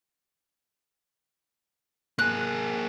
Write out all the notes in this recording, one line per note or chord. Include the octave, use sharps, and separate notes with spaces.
A#3 G#4 F#6